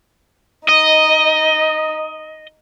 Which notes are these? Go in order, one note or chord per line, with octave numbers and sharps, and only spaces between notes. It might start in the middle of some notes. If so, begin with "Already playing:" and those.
D#4 D#5